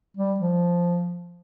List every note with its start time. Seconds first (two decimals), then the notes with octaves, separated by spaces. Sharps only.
0.17 G3
0.40 F3